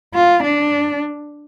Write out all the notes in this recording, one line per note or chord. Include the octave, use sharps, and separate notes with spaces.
F4
D4